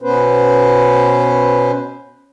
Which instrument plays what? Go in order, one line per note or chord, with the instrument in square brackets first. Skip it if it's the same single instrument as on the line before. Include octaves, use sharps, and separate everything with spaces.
[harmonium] B2 B3 C#4 B4 C5